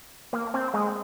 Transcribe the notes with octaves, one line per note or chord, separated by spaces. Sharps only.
A#3
C4
G#3